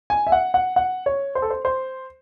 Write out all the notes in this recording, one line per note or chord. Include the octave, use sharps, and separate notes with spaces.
G#5
E5
F#5
F#5
F#5
C#5
C5
A4
C5
C5